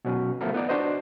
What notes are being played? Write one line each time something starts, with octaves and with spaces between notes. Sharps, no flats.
B2 F#3 C#4
F3 A3 B3 A4 A#4
B3 D#4 D5
D4 F#4 C5 D#5